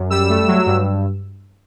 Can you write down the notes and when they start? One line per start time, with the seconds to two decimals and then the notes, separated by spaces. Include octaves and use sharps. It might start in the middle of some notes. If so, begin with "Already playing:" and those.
Already playing: F#2
0.10 G3 E6
0.29 A3
0.47 F#3
0.66 G2